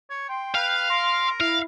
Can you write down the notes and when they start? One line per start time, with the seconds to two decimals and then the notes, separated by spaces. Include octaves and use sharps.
0.10 C#5
0.29 G5 C6
0.55 B4 F5 G5
0.90 A#4 C6
1.40 E4 F5